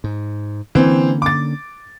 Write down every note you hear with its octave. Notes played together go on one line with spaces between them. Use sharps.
G#2
D3 E3 A#3 C4 C#4
D6 A6